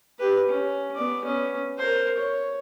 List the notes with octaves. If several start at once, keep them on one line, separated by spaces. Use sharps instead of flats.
G4 B4
C#4
B3 D5
B3 C#4
A#4 C5
C#5